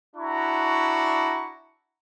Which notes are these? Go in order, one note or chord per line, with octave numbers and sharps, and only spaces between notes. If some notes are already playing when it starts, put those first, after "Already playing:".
D4 E4 F#4 A#5 C#6